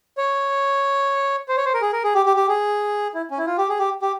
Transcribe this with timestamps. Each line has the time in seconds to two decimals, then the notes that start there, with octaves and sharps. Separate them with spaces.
0.17 C#5
1.49 C5
1.57 C#5
1.65 C5
1.74 A#4
1.81 G#4
1.93 A#4
2.04 G#4
2.15 G4
2.26 G4
2.37 G4
2.48 G#4
3.14 E4
3.31 C#4
3.38 E4
3.47 F4
3.58 G4
3.69 G#4
3.79 G4
4.02 G4